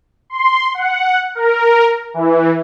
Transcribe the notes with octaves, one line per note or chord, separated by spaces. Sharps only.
C6
F#5
A#4
E3